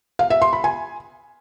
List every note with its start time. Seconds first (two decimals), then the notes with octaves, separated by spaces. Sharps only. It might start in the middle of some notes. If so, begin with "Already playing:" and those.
0.19 F5
0.30 E5
0.42 C6
0.53 B5
0.64 G#5